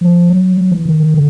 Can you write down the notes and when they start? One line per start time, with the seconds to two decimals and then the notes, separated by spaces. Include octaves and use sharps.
0.01 F3
0.29 F#3
0.57 F#3
0.72 E3
0.85 D#3
1.00 D#3
1.14 D3